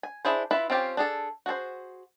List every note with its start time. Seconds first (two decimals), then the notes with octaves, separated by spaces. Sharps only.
0.03 G#5
0.25 D4 E4 G#4 C5
0.51 E4 F4 B4 E5
0.70 C4 C#4 F4 G4
0.97 D4 G#4 A4
1.46 F#4 G#4 A4 C5